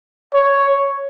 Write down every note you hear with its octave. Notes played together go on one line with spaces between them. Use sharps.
C#5